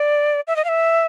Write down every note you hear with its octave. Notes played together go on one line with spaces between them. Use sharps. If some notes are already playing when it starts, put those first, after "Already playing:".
Already playing: D5
E5
D#5
F5
E5